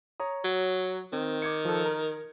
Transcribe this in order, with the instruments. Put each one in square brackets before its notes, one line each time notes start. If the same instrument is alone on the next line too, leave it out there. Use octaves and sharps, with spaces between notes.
[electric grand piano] C#5 A#5 D#6
[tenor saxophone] F#3
[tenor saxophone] D#3 [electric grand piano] C4
[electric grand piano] D6 G#6 C#7
F3 A4
A#4